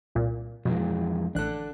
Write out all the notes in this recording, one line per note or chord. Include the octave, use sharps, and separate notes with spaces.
C2 A#2
F2 B2 E3 G#3
A1 D4 A4 F#6